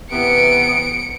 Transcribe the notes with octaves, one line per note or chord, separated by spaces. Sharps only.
C3 E3 B3 C#7 D7